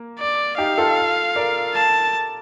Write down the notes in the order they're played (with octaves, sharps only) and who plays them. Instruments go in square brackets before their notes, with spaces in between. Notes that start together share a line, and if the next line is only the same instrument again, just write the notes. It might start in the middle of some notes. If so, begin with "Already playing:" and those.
Already playing: [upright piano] A#3
[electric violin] D5
[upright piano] D#4 G4 [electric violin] F5
[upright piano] F4 A4
A#4 D5
[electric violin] A5